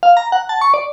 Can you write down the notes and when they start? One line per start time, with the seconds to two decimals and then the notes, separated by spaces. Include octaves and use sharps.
0.03 F5
0.17 A#5
0.32 F#5
0.49 A5
0.61 C#6
0.74 D5